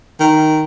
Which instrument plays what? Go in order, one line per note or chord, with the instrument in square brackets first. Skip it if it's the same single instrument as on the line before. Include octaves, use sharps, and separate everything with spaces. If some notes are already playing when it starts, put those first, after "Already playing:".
[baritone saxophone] D#3